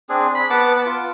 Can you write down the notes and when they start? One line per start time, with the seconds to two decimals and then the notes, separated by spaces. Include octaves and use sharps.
0.09 C4 D4 G#4
0.35 B5
0.50 B3 F#5 A5 D6
0.86 F4